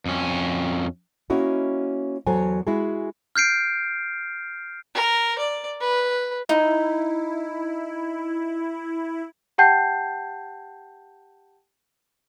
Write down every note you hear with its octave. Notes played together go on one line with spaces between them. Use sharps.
F2 C#4
A#3 C#4 E4 F#4 D#5
E2 F#3 A4 C5 G#5
G#3 E4 F#4 G#4
F6 G6 C7 D7
A#4
D5
B4
D#4 E4
G4 F#5 G5 A5 G6 C7